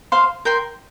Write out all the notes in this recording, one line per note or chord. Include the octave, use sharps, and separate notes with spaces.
C5 F5 C6
A#4 G5 C6